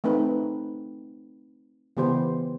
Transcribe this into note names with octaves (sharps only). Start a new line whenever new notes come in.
A3 C4 D#4 B4
C#3 E3 B3 G4 C5